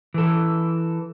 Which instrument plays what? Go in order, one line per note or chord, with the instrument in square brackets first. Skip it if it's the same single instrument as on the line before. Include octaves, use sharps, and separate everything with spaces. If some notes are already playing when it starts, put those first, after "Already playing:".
[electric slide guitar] E3 A4